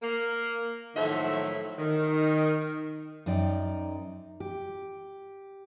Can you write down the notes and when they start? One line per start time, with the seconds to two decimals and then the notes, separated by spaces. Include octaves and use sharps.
0.02 A#3 A#4
0.96 A2 D#3 F3 F#3 A4 E5
1.78 D#3
3.26 F#2 D#4 D5 G5
4.40 G4